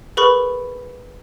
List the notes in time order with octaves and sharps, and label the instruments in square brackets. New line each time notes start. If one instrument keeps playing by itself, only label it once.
[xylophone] G#4 A#4 B4 B5 C#6